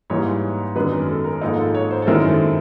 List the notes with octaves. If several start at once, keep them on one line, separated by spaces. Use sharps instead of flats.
G#2 E3 G3 A#3 D#4 C#5
F#2 D#3 G#3 B3 D4 B4
A#4
A4
A#4
G#2 F3 A#3 D#4 A4
A4
C#5
C5
A4
F#2 D#3 G#3 C4 E4 A#4
A4